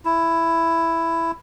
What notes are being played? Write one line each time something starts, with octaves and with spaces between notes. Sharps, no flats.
E4